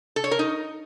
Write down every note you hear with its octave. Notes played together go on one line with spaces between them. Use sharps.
A4
C#5
A#4
D#4